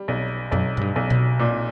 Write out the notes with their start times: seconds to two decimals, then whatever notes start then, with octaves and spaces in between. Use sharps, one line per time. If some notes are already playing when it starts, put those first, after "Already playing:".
Already playing: G3
0.08 B1
0.51 B1 F#2
0.77 G#2
0.81 G2
0.96 B1
1.10 B2
1.40 A#2